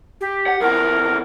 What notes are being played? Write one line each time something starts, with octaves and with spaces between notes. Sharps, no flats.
G4
F#5
F2 E3 A#4